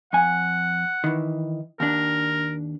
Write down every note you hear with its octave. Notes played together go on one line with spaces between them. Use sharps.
F2 F#5 G#5
D#3 E3
D#2 D4 A#4